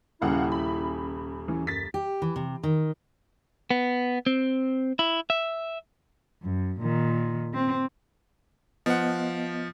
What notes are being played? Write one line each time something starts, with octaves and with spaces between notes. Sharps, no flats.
D#1 C#3 E4 F5 F#5
B5
E3 C#4
F#2 A6 B6
G4
E3
C3
D#3
B3
C4
E4
E5
F#2
A#2 D#3
C4
F3 B3 D#5 F#5